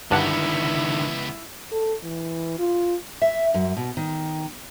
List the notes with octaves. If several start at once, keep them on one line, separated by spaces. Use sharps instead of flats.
C#2 G2 D3 D#3 B3 D4 E4 F#5
A4
E3
F4
E5
F#2
B2
D#3